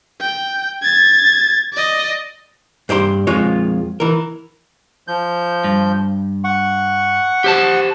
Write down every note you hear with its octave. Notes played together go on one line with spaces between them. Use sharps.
G5
G#6 A6
D5 D#5
G2 C5 D5 B5 C6
F2 G#3 F4 C#5
E3 A#4
F3 G6
G2
F#5 C#6
G4 C5 A5